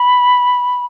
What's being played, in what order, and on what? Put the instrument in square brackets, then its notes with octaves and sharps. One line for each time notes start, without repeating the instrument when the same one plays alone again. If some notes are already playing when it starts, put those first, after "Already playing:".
Already playing: [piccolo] B5